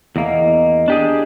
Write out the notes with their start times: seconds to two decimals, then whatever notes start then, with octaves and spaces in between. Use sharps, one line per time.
0.16 E2 A#3 D#5 F5
0.88 D4 G4 G#4